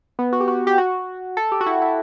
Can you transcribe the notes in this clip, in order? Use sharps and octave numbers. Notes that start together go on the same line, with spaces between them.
B3
F#4
G4
F#4
G4
F#4
A4
G4
F#4
E4
E4